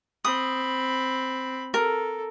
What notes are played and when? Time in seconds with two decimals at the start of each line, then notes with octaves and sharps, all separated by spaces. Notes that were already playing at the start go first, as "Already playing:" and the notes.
0.25 C4 B5 D#6
1.74 A4 A#4